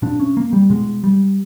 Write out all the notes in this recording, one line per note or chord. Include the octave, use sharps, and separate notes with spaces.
B2 D4
C#4
A#3
G3
B2 G#3
G3